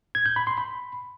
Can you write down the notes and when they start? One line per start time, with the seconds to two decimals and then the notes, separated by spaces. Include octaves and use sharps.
0.15 G#6
0.26 G6
0.36 B5
0.47 C6
0.58 B5